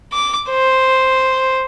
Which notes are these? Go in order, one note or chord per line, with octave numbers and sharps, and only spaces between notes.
D6
C5